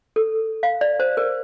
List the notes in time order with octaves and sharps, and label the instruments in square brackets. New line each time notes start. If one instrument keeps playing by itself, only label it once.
[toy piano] A4
F5
D5
C5
A#4